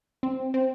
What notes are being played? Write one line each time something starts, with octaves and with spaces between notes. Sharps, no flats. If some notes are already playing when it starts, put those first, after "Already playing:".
C4
C4